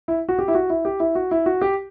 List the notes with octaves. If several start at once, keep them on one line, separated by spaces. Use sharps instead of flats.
E4
F#4
G4
E4
F#4
E4
G4
E4
F#4
E4
F#4
G4